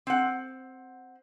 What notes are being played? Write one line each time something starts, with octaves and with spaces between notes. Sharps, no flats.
C4 F#5